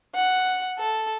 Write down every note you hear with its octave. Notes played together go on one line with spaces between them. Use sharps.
F#5
A4